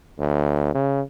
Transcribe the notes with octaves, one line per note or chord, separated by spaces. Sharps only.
D2
C#3